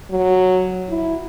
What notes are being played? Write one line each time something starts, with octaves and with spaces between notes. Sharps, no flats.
F#3
E4